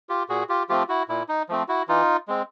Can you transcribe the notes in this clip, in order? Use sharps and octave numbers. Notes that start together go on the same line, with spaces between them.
F4 G4
A#2 F#4 G#4
F4 G4
F3 A3 C4 F4 G4
E4 F#4
A#2 E4
D#4
F3 A3 C4
E4 F#4
E3 D#4 F4
G#3 C4